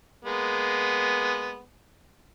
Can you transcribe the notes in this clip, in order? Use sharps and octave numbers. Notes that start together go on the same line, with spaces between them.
G#3 A#3 B3